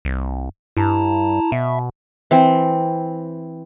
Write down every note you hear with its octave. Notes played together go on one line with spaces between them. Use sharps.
C2
G2 E4 A5 A#5
B2 E5
E3 C4